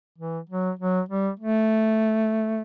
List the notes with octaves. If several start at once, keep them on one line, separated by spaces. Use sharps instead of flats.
E3
F#3
F#3
G3
A3